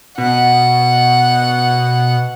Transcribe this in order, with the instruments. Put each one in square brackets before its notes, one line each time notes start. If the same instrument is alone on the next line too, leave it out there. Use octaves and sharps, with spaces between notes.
[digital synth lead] B2 [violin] F#5